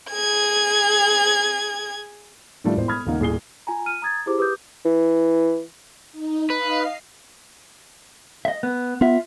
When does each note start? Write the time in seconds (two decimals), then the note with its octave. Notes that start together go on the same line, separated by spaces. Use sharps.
0.12 G#4 G#6
2.64 A2 D#3 G3 A3 D4 F4
2.76 E1 A2 C5
2.88 B5 D#6 F6 G#6
3.05 D#1 D#2 C#3 A#3 D#4 F#5
3.20 D#1 A2 G#4 C7 G7
3.67 F4 G#5 A#5
3.86 F6 D#7
4.02 A#5 D#6 G#6 A6
4.26 E4 F4 G4 G#4 C5 D6
4.38 G4 B4 D6 D#6 G6
4.85 E3
6.12 D#4
6.50 B4 D#5 F5 C7
8.45 D#5 E5
8.63 B3
9.01 B3 F4 E5